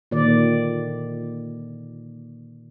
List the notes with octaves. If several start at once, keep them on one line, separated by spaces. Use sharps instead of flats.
A#2 D3 D#3 D5